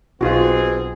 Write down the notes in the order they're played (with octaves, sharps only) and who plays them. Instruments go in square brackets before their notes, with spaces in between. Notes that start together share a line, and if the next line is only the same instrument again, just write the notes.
[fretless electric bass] B1 [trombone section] B2 C4 G#4 [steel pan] F4 F#4